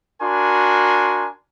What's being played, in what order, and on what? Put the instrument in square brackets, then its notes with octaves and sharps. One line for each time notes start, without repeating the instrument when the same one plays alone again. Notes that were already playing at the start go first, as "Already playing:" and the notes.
[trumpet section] D4 F#4 A#4 G#5 C6